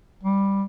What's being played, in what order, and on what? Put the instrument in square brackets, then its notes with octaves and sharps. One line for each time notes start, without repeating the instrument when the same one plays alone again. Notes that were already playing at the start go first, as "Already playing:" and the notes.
[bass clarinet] G3